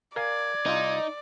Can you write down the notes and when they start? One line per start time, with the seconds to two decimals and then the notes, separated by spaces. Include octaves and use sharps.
0.16 A#4 D5 F5 G#5 G#6
0.66 C2 D#4 F4